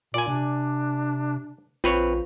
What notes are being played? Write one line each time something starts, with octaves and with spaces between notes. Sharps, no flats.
A#2 D5 G#5
C3 D4
A#1 C4 F4 B4 C#5